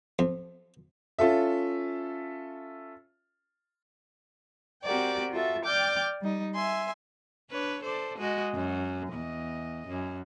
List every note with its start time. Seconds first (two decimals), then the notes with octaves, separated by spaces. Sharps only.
0.19 F2
1.19 C#4 F4 A4 E5
4.84 C4 F#4 G4 A#4 D5 G5
5.31 F4 F#4 A4 E5
5.65 D5 G5 D6 F6 G6
6.21 G3 D#4
6.56 E5 G#5 C6
7.51 D4 B4 C#5
7.82 A4 C5 D5
8.18 G#3 F#4 D#5
8.54 F#2
9.11 E2 D#5
9.88 F#2